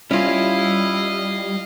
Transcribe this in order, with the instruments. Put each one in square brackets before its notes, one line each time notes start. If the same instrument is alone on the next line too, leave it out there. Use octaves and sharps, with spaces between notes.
[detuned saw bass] G3 [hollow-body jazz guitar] C#4 F4 [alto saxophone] E4 [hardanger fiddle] D#5 F5